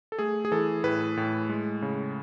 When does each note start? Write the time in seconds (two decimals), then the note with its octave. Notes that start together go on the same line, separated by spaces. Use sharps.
0.12 A4
0.19 A3 G#4
0.45 G#4
0.52 E3 A4
0.84 A2 B4
1.17 A2
1.49 G#3
1.82 C#3